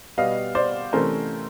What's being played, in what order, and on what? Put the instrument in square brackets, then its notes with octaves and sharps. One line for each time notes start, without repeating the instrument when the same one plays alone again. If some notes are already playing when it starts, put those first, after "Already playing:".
[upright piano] B2 G3 B3 D#5 F5
C5 D5
C3 E3 A3 C#4 A#4 C5